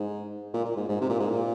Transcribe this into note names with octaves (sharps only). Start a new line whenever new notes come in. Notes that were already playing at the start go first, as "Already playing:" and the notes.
Already playing: G#2
A#2
A#2
G#2
G#2
C3
A#2
G#2
A#2